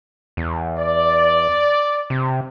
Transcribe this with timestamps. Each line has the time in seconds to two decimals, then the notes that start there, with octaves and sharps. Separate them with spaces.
0.37 E2
0.78 D5
2.10 C3